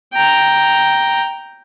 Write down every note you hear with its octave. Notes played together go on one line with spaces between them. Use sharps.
G5 A#5